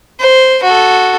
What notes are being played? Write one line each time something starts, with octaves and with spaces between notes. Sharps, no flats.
C5
F#4 A4